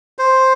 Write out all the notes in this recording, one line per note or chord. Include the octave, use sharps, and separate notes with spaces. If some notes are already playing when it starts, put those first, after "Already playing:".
C5